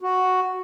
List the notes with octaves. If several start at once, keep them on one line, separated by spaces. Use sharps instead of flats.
F#4